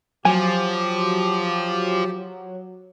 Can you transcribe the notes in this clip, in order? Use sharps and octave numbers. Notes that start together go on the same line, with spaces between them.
F3 F#3 G4 G#5